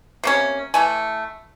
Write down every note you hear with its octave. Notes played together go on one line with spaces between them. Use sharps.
C3 A#3 C#4
E3 A3 G#5